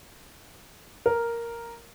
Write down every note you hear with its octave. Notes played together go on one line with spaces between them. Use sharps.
A#4